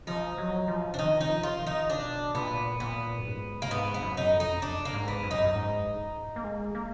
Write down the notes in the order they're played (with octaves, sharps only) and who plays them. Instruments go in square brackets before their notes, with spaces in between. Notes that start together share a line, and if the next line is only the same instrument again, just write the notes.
[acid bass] F3 [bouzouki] D#4
[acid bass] F#3
F3
[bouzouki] D4
[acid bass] D#3 [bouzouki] D#4
[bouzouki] D#4
[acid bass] F3
[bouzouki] F4
[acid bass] D#3
[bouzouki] D#4
[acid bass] B2 [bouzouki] D4
[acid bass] A#2 [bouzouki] B3
[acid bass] A#2 [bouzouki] B3
[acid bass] F#2
G#2
[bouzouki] A#3
[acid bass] F#2
[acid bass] G#2 [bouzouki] B3
[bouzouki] B3
[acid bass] F#2
[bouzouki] D#4
[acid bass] F2
[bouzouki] D#4
D4
A#3
[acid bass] G#2
[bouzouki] B3
[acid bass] F#2
[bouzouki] D#4
[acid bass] F#2
G#2
A#3
G#3
A#3